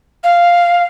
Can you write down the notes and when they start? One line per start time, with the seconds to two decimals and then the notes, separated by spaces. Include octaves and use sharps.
0.24 F5